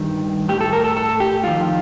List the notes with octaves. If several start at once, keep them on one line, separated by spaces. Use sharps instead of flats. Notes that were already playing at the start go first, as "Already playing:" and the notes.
Already playing: G2 D#3
A2 G4
A4
A#4
A4
A4
G4
F2 D#3 F4